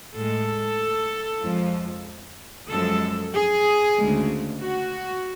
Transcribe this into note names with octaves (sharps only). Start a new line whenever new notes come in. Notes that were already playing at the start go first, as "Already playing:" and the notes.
A2 G#3 A4
F2 F3 G#3
F#2 F3 G#3 A4
G#4
D2 C#3 G#3
F#4